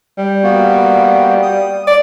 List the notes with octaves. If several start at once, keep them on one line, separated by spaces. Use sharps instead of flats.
G3
A#3 B3 F#4
D#6
D5